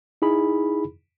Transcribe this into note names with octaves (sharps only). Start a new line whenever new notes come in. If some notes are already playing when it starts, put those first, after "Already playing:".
D#4 E4 G#4 B5